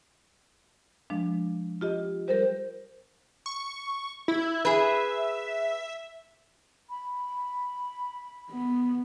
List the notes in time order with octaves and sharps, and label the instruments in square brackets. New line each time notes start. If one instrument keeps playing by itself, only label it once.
[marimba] F3 G#3 D4
F4 G4 D#5
[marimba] G3 A4 A#4 [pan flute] C5
[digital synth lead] C#6
E4
[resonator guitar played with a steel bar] G#4 B4 [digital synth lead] E5
[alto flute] B5
[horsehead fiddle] B3